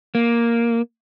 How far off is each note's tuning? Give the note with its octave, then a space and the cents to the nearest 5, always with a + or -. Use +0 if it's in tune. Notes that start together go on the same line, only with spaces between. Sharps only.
A#3 +5